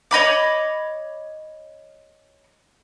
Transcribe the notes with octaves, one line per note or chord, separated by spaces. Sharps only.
C#5 D#5 B5 D6